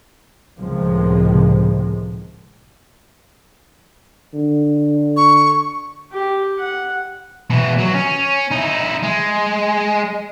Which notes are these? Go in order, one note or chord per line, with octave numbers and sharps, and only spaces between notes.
C#2 A2 C3 D#3 F3 G#3
D3
C#6
G4
F#5
B2 E3
F#3
C#4
D#4 E4
G#3